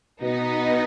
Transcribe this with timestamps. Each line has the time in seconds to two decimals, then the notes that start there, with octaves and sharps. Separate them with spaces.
0.21 B2 B3 D#4